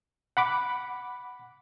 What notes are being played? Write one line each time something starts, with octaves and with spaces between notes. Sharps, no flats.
F#5 B5 D6